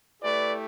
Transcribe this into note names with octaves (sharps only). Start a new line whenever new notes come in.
A3 E4 G4 B4 D5